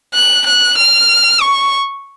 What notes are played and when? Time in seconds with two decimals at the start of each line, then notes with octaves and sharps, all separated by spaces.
0.14 F#6
0.46 F#6
0.78 F6
1.42 C#6